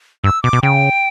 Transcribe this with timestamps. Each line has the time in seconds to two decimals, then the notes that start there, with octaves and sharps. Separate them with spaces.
0.24 G2 E6
0.43 B2 D6
0.53 B2
0.63 C#3 G5